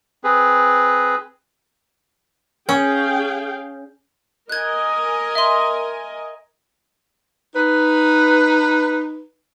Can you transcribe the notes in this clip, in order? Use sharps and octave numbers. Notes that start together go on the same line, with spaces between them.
C4 G#4 B4
C#4 G#4 F5 G5
A#4 D#5 G#5 F#6 G#6
E5 C6
D#4 B4